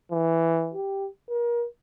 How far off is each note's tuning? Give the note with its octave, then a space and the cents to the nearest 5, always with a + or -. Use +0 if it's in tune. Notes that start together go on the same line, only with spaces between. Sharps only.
E3 +0
G4 +0
A#4 +30